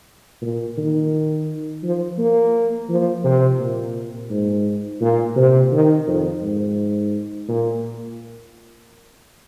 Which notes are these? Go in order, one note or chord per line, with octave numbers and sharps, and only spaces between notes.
A#2
D#3
F3
A#3
F3
C3
A#2
G#2
A#2
C3
D#3
F2
G#2
A#2